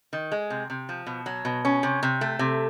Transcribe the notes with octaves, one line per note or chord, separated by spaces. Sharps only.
D#3
G#3
C3
C3
F3
B2
F#3
B2
C#4
C3
C3
A3
C3